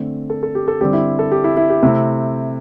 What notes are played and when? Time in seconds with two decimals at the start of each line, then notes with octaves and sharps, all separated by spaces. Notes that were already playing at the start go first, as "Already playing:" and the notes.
Already playing: D3 A3 C4
0.30 A4
0.43 A4
0.55 G4
0.68 A4
0.81 D3 G3 C4 G4
0.93 E4
1.19 A4
1.32 G4
1.44 E4
1.57 E4
1.70 G4
1.82 C3 A3 C4 E4